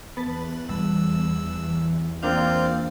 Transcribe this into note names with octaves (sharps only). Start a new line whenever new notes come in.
E2 B3 B4 A5
G3 E6
A#3 C4 D4 F4 F5 G6